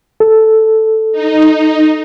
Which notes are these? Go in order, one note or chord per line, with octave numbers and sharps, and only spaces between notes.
A4
D#4